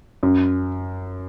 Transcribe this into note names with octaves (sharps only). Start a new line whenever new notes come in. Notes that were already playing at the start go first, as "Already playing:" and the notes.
F#2